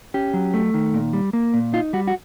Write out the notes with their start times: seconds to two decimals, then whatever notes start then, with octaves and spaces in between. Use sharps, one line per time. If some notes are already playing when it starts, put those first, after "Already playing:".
0.14 C#4 G4
0.34 F#3
0.54 A3
0.74 D#3
0.94 A#2
1.13 G3
1.33 A#3
1.54 A#2
1.73 D#4 F4
1.93 G3 F#4
2.07 F#4